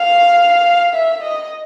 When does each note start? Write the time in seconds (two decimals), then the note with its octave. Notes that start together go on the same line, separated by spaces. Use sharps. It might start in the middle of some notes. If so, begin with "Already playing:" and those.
Already playing: F5
0.94 E5
1.23 D#5